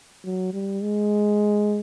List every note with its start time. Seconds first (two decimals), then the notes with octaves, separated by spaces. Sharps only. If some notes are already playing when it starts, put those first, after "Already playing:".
0.25 F#3
0.53 G3
0.83 G#3